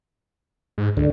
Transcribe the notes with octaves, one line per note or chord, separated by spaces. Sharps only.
G#2
C#2 D3